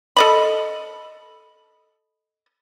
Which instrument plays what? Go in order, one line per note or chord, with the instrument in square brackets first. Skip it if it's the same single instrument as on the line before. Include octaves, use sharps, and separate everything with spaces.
[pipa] A4 D#5 B5